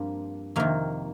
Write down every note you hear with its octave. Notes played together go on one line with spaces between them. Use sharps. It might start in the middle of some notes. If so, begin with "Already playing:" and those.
Already playing: G2 F3 A#3 C4 D4
F2 C3 D#3 A#3